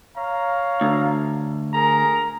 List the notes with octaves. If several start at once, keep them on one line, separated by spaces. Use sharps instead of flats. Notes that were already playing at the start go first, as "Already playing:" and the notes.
C#5 F5 A#5
D2
G#4 A#4 A#5